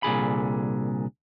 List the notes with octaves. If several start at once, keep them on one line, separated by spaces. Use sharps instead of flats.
C2 A#2 D3 G#4 B5